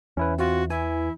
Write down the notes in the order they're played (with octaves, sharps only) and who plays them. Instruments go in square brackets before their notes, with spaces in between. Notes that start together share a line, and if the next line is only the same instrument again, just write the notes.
[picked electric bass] E2 [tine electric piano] C#4 E4 B4
[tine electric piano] C4 F4 [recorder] F#4
[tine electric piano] E3 G#5 [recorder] E4